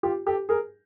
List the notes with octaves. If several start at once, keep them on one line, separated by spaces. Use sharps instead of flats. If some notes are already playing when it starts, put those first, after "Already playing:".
F4 G4
G4 A4
G#4 A#4